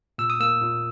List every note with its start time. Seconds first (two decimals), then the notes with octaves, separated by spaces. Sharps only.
0.18 A#2 E6
0.30 D#6
0.40 A#3 E6
0.61 A#2